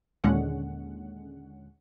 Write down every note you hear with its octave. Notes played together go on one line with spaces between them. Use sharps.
D#2 A#2 D3 G#3 C#4 F#5